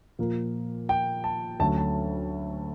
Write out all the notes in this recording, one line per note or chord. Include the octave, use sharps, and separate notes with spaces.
A#2 F3 A#3
G5
A5
D2 D3 F#3 A3 C#4 A5
A5